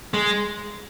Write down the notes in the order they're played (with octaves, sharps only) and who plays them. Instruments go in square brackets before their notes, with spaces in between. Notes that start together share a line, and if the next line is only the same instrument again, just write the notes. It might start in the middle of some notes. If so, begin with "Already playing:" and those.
[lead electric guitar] G#3